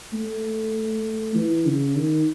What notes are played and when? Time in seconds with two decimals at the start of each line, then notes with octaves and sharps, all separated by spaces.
0.13 A3
1.35 E3
1.66 C#3
1.96 D#3